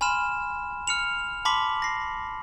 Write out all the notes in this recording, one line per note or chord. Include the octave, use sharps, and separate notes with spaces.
G#5 B5 C6 F6 E7
F6 C#7 F7
A5 B5 C6 D6 B6 F#7
A#6 C7